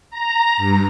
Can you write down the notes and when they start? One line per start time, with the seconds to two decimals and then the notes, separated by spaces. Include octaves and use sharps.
0.10 A#5
0.57 G2